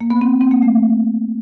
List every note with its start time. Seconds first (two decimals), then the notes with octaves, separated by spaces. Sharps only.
0.01 A#3
0.10 B3
0.21 C4
0.41 C4
0.51 A#3
0.62 A3